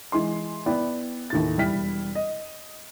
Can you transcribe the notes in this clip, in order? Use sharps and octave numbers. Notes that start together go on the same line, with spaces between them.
E3 G#3 C6
B3 E4 D5 G5
D#2 A2 A6
E1 G3 E4 G5 F6 B6
D#5